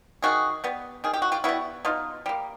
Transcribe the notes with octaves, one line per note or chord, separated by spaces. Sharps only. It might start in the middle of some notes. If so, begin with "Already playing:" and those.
D#3 F#4 G#4
G3 B3
D#3 G#4
G4
F#4
F4 G4
G3 B3 E4 F#4
B2 D#4 F4
G3 A#3